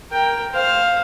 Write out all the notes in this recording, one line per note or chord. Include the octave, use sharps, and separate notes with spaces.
A#4 G5
C5 F5